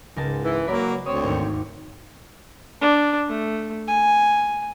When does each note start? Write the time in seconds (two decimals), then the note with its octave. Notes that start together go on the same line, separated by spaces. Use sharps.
0.16 C#2 G#2 A#4 A5
0.43 E3
0.67 F#3 A#3 A#4 D5 B5
1.06 D2 C4 C#5 D#6
1.24 G#1 D#2
2.81 D4
3.28 A3
3.88 G#5